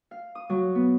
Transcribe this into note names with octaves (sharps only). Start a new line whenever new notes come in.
F5
D#6
F#3
B3